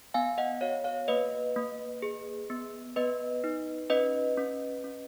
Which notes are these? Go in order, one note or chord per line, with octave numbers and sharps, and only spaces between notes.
B3 F5 G#5
D#5 F#5
F#4 C#5 F5
C#5 F5
A#3 B4 D#5
A#3
G#4
B3
B3 B4 D#5
D#4
C#4 B4 D#5
C#4
C#4